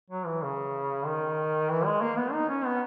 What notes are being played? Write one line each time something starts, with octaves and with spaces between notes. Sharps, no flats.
F#3
E3
C#3
D#3
E3
G#3
A#3
B3
D#4
C#4
B3